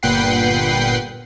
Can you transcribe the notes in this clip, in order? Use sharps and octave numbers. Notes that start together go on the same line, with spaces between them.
G1 A#2 B4 F#5 G5 C7